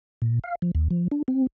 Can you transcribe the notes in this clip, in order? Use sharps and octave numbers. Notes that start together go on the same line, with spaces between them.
A#2
F5
F3
D#2
F3
D4
C4